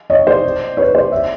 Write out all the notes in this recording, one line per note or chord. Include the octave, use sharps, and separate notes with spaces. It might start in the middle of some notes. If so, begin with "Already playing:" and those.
C#5 D#5
C5 D5
B4 C#5
C5 D5
D5 E5